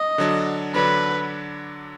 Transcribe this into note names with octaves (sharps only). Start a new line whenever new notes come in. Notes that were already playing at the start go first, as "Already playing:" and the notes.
Already playing: D#5
D3 F#3 D4
D3 F#3 D4 B4